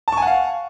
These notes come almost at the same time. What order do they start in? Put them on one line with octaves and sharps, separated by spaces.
A5 C#6 G#5 F#5 F5